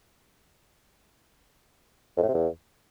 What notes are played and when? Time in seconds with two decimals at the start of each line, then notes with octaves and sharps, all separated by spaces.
2.17 F2
2.23 A2
2.28 C3
2.34 E2